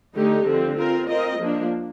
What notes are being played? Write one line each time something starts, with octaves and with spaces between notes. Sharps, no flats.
D3 A3 D#4 G4
D3 F3 C4
C4 F4 A#4
C4 F4 A#4 D#5
F3 A#3 D4